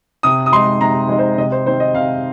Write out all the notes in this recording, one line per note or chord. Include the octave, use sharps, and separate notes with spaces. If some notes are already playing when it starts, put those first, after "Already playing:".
C3 D#6
D#6
G#3 D#4 C6
C3 A#5
G#3 D#4 D#5
C5
C3 D#5
C5
D#3 C4 D#4 C5
D#5
C3 F5